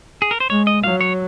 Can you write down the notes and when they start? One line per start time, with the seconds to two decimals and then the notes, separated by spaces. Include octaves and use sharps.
0.22 G#4
0.31 A#4
0.40 C5
0.50 G#3 C#5
0.67 D#5
0.84 F#3 F5
1.01 C#5